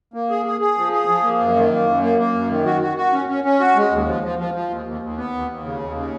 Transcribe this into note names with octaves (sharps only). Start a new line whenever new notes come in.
A#3
G#4
G#4
G#4
F3
G#4
F3
A#3
F#2
D#3
A#3
F#2
A#3
A#3
F#2
D#3
F#4
F#4
F#4
C#4
C#4
C#4
F#4
G#3
D#2
F3
F3
F3
F3
D#2
D#2
D#2
B3
D#2
D#2
C#3
D#2
C#3